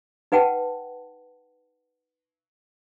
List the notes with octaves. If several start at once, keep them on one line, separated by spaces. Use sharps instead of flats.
D#4 B4 F#5 G5 A5